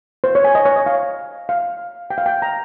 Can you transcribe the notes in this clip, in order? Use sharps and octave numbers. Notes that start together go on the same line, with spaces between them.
C5
C#5
G#5
D#5
C#5
D#5
F5
F5
G5
F5
G5
A#5